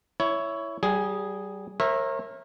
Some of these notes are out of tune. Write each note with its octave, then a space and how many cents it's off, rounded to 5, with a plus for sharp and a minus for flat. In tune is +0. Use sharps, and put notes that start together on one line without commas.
E4 +0 C#5 +10
G3 -30 G#4 +0
A#4 +0 C#5 -40 E5 +0